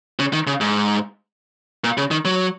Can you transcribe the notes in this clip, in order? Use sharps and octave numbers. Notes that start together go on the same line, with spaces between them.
C#3
D#3
C#3
G#2
A#2
C#3
D#3
F#3